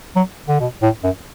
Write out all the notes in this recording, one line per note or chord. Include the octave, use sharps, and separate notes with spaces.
F#3
D3
B2
A2
F#2